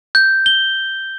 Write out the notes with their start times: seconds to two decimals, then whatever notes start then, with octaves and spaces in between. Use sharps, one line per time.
0.15 G6
0.46 G7